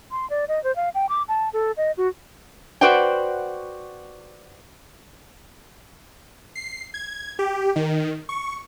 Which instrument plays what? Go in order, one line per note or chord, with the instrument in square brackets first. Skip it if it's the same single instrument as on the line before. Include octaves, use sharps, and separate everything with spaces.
[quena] C6
D5
D#5
C5
F5
G5
D6
A5
A4
D#5
F#4
[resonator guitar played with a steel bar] F#4 B4 C5 D5 F#5 G5
[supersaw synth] C7
G#6
G4
D#3
C#6